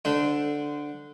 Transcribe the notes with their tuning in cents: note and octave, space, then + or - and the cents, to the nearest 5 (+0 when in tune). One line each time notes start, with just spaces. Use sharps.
D3 +0 D4 +0 C5 -25